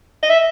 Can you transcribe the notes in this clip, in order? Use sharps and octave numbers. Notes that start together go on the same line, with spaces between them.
D#5
E5